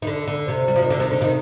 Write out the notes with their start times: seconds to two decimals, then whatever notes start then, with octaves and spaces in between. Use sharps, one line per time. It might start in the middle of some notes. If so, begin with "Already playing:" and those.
0.02 D#3
0.07 D3
0.28 D3
0.48 C3
0.68 G3
0.76 F3
0.82 D#3
0.90 D3
1.00 C3 D#3
1.11 D3
1.21 C3 D#3